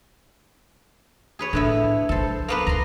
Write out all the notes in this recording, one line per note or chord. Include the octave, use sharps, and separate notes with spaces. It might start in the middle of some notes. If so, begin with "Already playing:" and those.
G#4 B4 C#5
A2 D3 B3 E4
C#3 F#3 A4 C5
A#3 B3 B4
C#2 A#5 C6